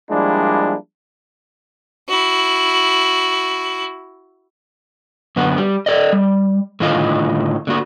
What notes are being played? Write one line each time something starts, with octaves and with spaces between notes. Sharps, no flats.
F3 G3 G#3 A#3 D4 E4
E4 F#4
F#2 D3 B3 F#4
G3
A4 D5 D#5
G3
A2 D3 D#3 F4 D#5 F5
D3 A#3 F#4